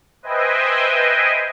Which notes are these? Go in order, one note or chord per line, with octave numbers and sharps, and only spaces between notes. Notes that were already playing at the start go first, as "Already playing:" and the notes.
B4 C5 D#5 E5 G5 G#5